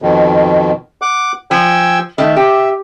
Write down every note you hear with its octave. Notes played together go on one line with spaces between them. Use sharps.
F2 B2 D#3
F#5 D6
F3 G5 G#5 E6
D#3 A3 E5
G4